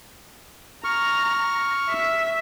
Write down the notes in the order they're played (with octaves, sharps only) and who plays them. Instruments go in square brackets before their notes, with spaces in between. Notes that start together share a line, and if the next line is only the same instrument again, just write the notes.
[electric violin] A#5 [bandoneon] C#6 F6
[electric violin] E5 B6